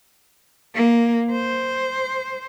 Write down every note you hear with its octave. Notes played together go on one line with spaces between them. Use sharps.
A#3
C5